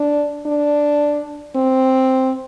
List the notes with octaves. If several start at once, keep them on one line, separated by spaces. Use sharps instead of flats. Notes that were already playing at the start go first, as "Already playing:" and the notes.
Already playing: D4
D4
C4